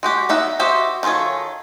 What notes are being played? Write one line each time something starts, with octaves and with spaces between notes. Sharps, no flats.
G#3 F#4 G4
B3 D#4 E5 F#5
F#4 G4 C5 D#5 E5
D#3 F4 G#4 A4 C#5